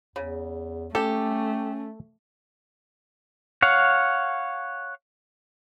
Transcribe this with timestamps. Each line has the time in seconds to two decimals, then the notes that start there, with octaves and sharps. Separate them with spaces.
0.16 E2 C#3
0.95 A3 C#4 G4 A4
3.62 C#5 F5 F#5